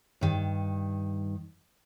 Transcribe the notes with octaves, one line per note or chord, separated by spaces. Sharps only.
G2 D#3